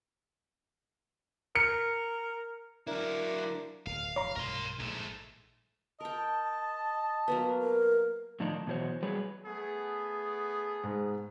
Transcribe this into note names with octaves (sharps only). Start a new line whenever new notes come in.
A#4 C#7
F#3 D4 E4 A#4
D1 F5
F1 G#2 E3 C#5 A#5 B5
B1 G2 F3 A#4 C6
A#1 G#2 A3
A#4 D#5 G5 A5
F#3 A#3 B3
A#4
A2 D#3 F3 D4 D#4
B2 E3 F#3 G#4 C5 C#5
F#3 G3 G#4 B4 C#5
A3 B3 G#4
G#2